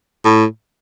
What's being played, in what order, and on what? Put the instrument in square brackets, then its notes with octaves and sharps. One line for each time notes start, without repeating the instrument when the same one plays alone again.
[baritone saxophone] A2